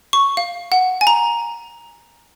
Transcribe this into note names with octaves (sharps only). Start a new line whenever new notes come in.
C#6
F5
F#5
G#5
A#5